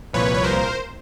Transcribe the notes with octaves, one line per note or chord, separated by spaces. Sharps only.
C2 A#2 F3 B4 C#5
C#5
A#4 C5